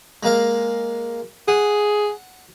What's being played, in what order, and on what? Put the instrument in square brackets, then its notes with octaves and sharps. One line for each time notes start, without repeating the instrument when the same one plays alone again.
[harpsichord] G#3 A#3 F5
[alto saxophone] G#4 [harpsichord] F#5